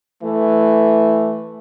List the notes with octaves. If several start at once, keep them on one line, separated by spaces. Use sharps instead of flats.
E3 A3